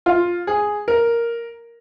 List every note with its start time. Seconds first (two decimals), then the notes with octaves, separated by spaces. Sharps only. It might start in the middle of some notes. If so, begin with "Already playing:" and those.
0.06 F4
0.47 G#4
0.88 A#4